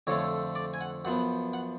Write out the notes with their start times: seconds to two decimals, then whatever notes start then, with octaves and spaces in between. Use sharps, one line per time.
0.07 F2 D3 F3 A3 C#5
0.55 D5
0.74 G#5
0.81 F#5
1.05 F#2 F3 B3 F#5
1.54 F#5